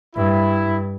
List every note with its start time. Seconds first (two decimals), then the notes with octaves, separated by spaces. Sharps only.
0.16 G2 E4